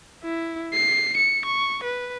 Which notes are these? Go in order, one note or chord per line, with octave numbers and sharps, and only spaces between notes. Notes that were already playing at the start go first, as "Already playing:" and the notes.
E4
C7
C#7
C#6
B4